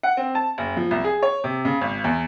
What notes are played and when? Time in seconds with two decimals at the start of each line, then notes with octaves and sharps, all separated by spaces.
0.03 F#5
0.17 C4
0.35 A5
0.58 F#1
0.77 F3
0.91 C2
1.04 G#4
1.23 C#5
1.44 C3
1.65 C#3
1.81 G#1
2.04 E2